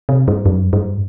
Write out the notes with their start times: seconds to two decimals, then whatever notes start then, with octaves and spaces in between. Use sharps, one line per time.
0.09 C3
0.28 G2
0.46 F#2
0.73 G2